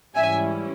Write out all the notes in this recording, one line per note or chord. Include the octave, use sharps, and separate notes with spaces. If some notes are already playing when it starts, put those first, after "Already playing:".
G#2 E3 G3 C#4 E4 E5 G#5